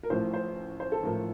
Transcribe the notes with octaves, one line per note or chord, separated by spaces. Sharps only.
A#4
A1 A2 F3 C5
C5
C5
A4
A1 A2 F3 A#4